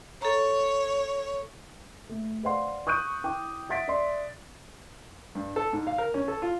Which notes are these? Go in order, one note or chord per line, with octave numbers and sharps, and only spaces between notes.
A4 C#5 A#5
A3
B4 C5 D5 F5 F#5 C6
C#6 D#6 F#6 G6 D#7
E4 G5 D6
E5 F#5 A6 B6 D7
D5 E5 C6
G2
A4
G#2
F5
A#4
C#4
A4
F4